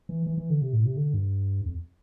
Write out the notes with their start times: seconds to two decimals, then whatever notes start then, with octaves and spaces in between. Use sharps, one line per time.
0.09 E3
0.26 E3
0.37 E3
0.50 D3
0.62 C3
0.73 A2
0.85 C3
0.96 D3
1.14 G2
1.66 F2